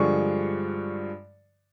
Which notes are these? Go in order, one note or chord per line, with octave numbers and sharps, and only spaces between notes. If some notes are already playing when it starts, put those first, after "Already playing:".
Already playing: G2 D3 F3 G#3 C#6